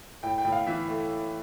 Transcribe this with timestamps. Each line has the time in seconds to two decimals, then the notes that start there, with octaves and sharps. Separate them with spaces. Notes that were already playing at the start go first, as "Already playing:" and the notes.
0.23 A2 G5
0.38 G5
0.45 A2
0.52 F5
0.67 E3 E5
0.89 A3